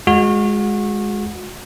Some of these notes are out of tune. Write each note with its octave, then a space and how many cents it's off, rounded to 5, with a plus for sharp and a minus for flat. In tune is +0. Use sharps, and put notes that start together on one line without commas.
G#3 +0 F#4 -30